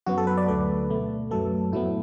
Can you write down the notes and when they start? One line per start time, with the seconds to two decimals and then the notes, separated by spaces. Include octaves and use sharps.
0.06 F#2 F#3 B3 F#4
0.18 A4
0.27 B4
0.37 D5
0.48 D2 D3 A3 B4
0.90 B2 A3
1.31 F#2 F#3 A3 A4
1.72 A2 F#3 B3 E4